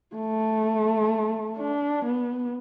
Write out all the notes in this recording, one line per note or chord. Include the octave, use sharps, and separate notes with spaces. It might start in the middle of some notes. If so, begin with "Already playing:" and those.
A3
D4
B3